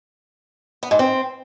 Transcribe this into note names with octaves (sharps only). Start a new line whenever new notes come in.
B3
G#2
C4